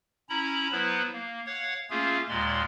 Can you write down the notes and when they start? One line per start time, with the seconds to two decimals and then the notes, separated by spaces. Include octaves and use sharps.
0.29 C#4 E4 A#5 B5
0.72 F#3 B3 E4 B4 C5
1.14 A#3
1.46 C#5 F5 F#5
1.90 A3 A#3 C#4 F4 G#4 F5
2.29 D#2 A#2 G#3 D5 C6